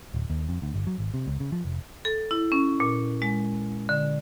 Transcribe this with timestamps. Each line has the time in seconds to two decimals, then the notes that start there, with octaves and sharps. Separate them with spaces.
0.14 D1
0.30 D#2
0.49 F2
0.62 D2
0.74 G1
0.87 F#3
0.99 G#1
1.14 C3
1.27 C#2
1.40 C#3
1.52 F3
1.65 F1
2.05 A4
2.31 E4
2.52 C#4
2.80 A#2
3.22 G#3
3.89 D3